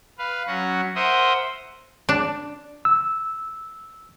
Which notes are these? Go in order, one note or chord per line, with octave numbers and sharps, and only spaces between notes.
B4 F5
F#3 C#4 F#4 F#5
A#4 C5 E5 F#5 C6 D#6
D4
E6